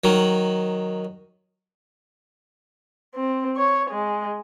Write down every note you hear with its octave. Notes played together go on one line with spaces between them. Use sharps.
D#3 F#3
C4
C#5
G#3